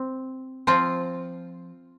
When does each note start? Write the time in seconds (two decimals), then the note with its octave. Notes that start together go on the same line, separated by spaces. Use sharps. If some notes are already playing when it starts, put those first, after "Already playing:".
Already playing: C4
0.67 F3 C4 F4